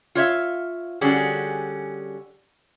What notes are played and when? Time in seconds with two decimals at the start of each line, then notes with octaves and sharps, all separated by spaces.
0.15 F4 C#5 E5 F5
1.01 D3 G3 C#4 F#4 G#4